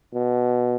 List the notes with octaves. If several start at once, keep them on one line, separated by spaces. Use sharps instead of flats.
B2